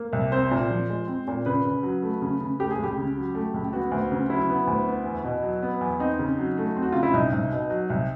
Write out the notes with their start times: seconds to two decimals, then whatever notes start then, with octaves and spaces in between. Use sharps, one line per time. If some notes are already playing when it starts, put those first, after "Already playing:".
Already playing: A#3
0.13 C2
0.32 C4 C5
0.51 A#2
0.70 F3
0.90 G#3
1.08 C4
1.27 A#2
1.46 C#3 B4
1.64 C#3
1.83 F#3
2.03 A3
2.22 C#3
2.41 C#3
2.60 A3 G4
2.71 G#4
2.79 C#2 G4
2.97 C#3
3.17 F#3
3.35 A3
3.54 C#2
3.73 B3 F#4
3.91 D2
4.11 C#3
4.30 F#3 E4
4.49 B3
4.67 D2
4.87 B3
5.05 E2
5.24 B2
5.43 F#3
5.62 B3
5.81 E2
6.00 C4 D#4
6.19 C#3
6.39 F#3
6.58 A3
6.76 C4
6.82 F#4
6.92 C#3 F4
7.03 E4
7.13 C2 D#4
7.32 C2
7.52 B2
7.70 F#3
7.90 C2